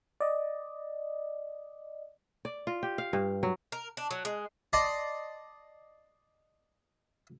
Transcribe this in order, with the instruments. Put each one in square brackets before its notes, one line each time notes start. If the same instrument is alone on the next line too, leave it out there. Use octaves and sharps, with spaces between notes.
[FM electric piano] D5 D#5
[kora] D5
F4
G4
F5
G2
F#3
[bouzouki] A#4
D4
F#3
G#3
[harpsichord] D5 D#5 A5 C6